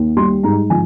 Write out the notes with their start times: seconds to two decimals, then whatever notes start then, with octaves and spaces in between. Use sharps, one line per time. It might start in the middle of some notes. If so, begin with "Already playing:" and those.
Already playing: D#2
0.17 G3 C6
0.43 G#2 A#5
0.70 F3 G#5